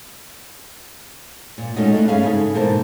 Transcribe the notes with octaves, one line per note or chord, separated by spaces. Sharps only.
A#2
G#3 A3 C#4 D#4 F#4 D#5
A3 D4 E4
G2 C#4 G#4 E5 F5
G#2 C#3 E4 G#4 A4
G#2 B2 E3 A#3 C5 A5